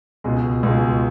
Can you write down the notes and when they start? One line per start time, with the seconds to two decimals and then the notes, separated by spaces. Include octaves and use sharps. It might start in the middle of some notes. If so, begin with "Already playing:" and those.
0.24 C#2 B2 G#3
0.63 C#2 B2 G#3